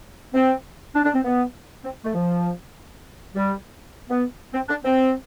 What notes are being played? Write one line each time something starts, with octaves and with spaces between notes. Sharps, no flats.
C4
D4
D4
C4
B3
C4
A3
F3
G3
B3
C4
D4
C4